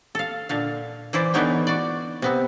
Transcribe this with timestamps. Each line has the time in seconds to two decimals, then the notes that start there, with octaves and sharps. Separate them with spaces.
0.15 A4 F5
0.49 A#2 D3 F5
1.13 E3 E4 C5 D5
1.34 D3 E3 B3 D#4 C#5 G5
1.67 F#4 D5
2.22 C3 B3 C4